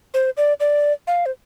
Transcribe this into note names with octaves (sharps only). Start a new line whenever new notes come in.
C5
D5
D5
F5
C5